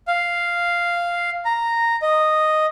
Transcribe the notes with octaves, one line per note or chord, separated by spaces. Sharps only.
F5
A#5
D#5